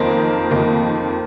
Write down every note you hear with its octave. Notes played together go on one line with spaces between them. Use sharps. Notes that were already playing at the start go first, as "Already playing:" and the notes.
Already playing: F2 D#3 A#3 D#4 A#4 C5
F2 D#3 A#3 D#4